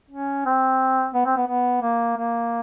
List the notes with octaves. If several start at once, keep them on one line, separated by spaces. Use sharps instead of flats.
C#4
C4
B3
C4
B3
B3
A#3
A#3